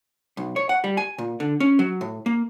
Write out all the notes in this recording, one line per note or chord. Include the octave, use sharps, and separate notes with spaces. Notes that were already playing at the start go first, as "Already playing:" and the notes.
B1
C#5
F#5
G3
G#5
A#2
D3
C#4
F#3
A2
A#3